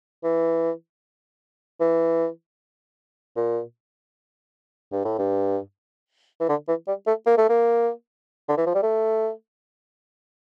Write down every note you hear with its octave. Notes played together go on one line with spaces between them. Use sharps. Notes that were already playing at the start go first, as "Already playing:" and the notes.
E3
E3
A#2
G2
A2
G2
E3
D3
E3
G3
A3
A#3
A3
A#3
D3
E3
F3
G3
A3